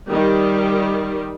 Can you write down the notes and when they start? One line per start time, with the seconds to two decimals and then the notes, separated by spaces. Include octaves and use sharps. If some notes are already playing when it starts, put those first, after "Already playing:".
0.10 D#3 G3